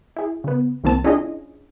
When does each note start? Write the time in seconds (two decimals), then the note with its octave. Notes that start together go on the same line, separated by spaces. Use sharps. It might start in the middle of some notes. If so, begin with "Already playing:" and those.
0.17 E4 G#4
0.44 C#3 B3
0.84 C2 E3 A#3 C4 A5
1.04 C#4 D4 E4 F4 G#4 D#5